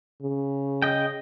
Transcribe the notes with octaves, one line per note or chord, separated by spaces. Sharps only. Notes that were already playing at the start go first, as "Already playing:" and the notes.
C#3
D#5 G5